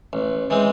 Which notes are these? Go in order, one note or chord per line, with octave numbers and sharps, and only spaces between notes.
A1
E3 G#3 C4